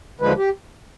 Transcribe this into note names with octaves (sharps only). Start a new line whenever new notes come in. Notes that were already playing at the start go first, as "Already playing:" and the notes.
D#2 D3 F3 G#3 B4
G4